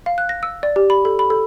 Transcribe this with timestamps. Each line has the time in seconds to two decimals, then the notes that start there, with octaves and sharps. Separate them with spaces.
0.06 F5
0.18 F#6
0.29 A#6
0.43 E6
0.63 D5
0.76 G4
0.90 B5
1.05 A4
1.19 B5
1.30 A4